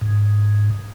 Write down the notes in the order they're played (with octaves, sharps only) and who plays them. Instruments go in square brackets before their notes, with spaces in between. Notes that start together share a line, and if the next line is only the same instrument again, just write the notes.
[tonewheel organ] G#2